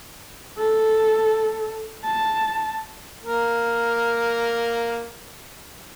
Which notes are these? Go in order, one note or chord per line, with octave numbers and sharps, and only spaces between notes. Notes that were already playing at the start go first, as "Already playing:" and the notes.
A4
A5
A#3 A#4